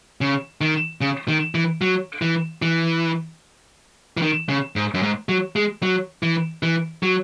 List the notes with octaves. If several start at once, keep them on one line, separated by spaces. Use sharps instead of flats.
C#3
D#3
C#3
D#3
E3
F#3
E3
E3
E3
D#3
C#3
G#2
F#2
G#2
F#3
G#3
F#3
E3
E3
F#3